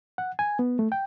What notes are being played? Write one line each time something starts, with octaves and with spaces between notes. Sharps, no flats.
F#5
G#5
B3
A3
G5